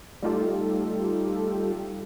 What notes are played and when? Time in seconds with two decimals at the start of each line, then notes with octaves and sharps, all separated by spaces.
0.22 G3 A3 D#4 F4 G4 A4